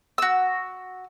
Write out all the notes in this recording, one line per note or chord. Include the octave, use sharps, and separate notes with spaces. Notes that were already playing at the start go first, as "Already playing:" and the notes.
F#4 E6